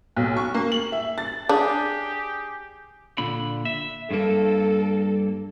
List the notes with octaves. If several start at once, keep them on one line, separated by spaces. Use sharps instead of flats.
B1
C#6
A#3
F#7
E5
A6
D4 G4 G#4
A#2 D3 B5
E5
G2 A#3 A4